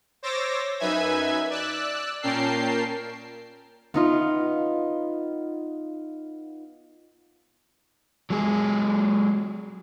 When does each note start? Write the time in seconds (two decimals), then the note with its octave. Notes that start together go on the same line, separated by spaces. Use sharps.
0.23 C5 C#5 D6 E6 A6 A#6
0.80 F#2 D#4 B4 E5 G#5 G#6
1.50 D5 E6 F#6
2.22 A#2 C#4 A#4 G5 A5 C7
3.94 B3 D#4 F4
8.30 F#3 G#3 G#4